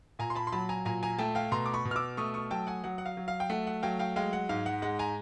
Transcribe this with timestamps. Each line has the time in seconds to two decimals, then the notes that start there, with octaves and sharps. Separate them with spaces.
0.19 A#2 G#5 A#5
0.30 C6
0.35 A5 B5
0.47 C6
0.52 F#3 A5 B5
0.69 G#5 A#5
0.85 A#2 G#5 A#5
1.03 G#5 A#5
1.18 A3 G5 A5
1.35 F5 G5
1.52 B2 A#5 C6
1.66 D6
1.73 B5 C#6
1.85 B2
1.91 F6
1.96 D6 E6
2.17 A3 C#6 D#6
2.34 C#6 D#6
2.51 F#3 G5 A5
2.67 F#5 G#5
2.84 F#3 F#5
2.98 F#5
3.06 F5
3.17 F#3
3.28 F5
3.40 G5
3.50 A3 F#5
3.67 F#5
3.83 F#3 F5 G5
3.99 F5 G5
4.16 G#3 F5 G5
4.33 F#5
4.49 G#2 F5
4.66 F#5
4.82 G#3 F#5
4.99 G#5 A#5